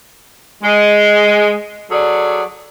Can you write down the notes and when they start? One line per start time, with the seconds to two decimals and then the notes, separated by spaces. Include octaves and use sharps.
0.63 G#3
1.91 F#3 G#4 A4 D5